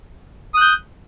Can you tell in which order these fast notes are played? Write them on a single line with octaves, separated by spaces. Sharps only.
D#6 F#6 G6